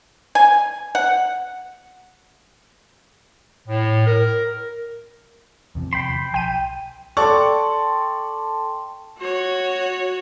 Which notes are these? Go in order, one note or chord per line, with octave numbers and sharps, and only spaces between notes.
G#5
F#5
A2
A#4
E2 C3 F3
G5 B5 C6
F3
B1 G5 D#7
A4 D5 G5 A5 C6 C#6
F#4 C#5